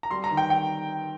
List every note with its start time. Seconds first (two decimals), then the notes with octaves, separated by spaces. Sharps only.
0.03 A#5
0.11 G3 C6
0.24 A#5
0.30 D#3
0.37 G5
0.50 G5